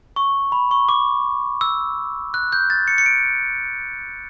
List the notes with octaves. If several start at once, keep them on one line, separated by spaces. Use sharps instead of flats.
C#6
B5
C#6
D6
E6
F#6
G6
A6
C#7
C#7
D7